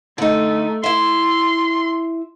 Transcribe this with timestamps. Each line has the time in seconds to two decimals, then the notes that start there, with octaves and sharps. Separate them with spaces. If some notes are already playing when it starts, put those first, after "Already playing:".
0.18 D3 A3 D#4
0.84 E4 E5 C6